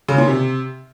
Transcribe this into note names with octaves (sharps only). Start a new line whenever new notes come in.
C#3
A#2
C3